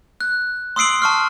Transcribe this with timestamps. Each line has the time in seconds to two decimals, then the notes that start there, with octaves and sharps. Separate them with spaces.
0.21 F#6
0.76 C6 D#6 E6 C7 D7 F#7
1.02 A5 C#6 F6